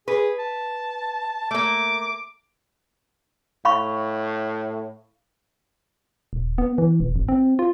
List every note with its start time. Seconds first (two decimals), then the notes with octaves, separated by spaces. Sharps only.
0.08 G#4 B4
0.39 A5
1.51 A3 A#3 D6
3.65 A2 F5 B5 C#6
6.33 D#1
6.58 B3
6.78 E3
7.00 E1
7.16 G#1
7.28 C4
7.59 F4